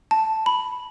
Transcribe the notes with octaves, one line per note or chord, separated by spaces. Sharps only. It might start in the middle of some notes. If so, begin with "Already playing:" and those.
A5
B5